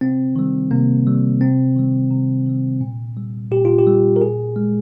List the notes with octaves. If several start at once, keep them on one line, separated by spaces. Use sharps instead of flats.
C3 C4
D#3 G3
C3 A#3
D#3 G3
C3 C4
D#3 G3
C3
D#3 G3
A#2
G3
A#2 G4
F4
G4
G3
A#4
A#2 G#4
G#3